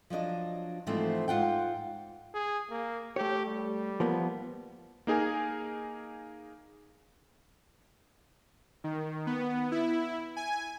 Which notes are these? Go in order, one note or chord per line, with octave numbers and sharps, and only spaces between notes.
F3 F#3 D4 D#5
G#2 E3 F3 A3 B3 C4
G#2 F4 F#5 G5
G#4
A#3
A3 G4 C#5
G3
F3 A#3 B3
A#3 D#4 G#4 A#4 G#5
D#3
B3
E4
G#5